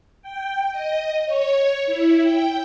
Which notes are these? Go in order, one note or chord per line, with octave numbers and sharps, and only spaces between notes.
G5
D#5
C#5
E4
G5